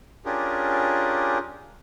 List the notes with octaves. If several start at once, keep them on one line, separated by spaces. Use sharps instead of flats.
C#4 D4 F4 G4 G#4 A#4